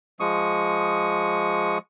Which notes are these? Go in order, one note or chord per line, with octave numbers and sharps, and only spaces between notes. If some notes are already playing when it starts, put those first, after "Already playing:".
F3 G#3 C#6 D#6